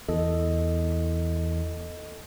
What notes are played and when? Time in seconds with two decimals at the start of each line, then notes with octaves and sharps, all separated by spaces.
0.08 E2 A4 D#5